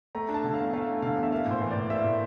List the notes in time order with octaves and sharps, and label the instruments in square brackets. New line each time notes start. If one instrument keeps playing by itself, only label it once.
[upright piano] A3 A#5
D4
A5
D3
F5
E2
A3 F5
D4
D3 F5
E2
E5
A#3 F5
A2 C5
E3
D5
A2
A#3 E5
A2